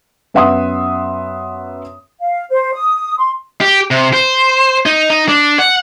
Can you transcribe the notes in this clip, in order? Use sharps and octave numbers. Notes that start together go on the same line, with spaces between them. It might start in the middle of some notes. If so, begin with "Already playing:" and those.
F#2 B3 E5 F#5 C6 D#6
F5
C5
D#6
C6
G4
C3
C5
D#4
D#4
D4
F#5